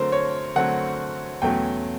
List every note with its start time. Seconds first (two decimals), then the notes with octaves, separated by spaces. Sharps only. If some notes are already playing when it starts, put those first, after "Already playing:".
Already playing: D3 F#3 A3 C4 A#4 C5
0.12 C#5
0.55 D3 F#3 A3 C4 F#5
1.42 E2 B2 F#3 A3 C#4 G5